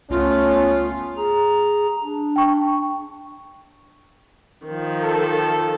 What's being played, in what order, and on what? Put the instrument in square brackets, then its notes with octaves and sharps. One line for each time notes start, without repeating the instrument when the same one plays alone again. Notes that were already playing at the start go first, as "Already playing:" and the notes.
[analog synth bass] C#2 [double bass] A3 B3 [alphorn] C#4 [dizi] F4
[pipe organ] G#4 A#5
D4
[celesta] G5 C#6
[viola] D#3 F3
[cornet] A4